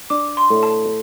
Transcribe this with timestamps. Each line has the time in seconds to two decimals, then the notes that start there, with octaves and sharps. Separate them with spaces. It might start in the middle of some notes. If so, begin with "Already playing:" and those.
0.10 D4 D6
0.37 C6
0.50 A2
0.63 A5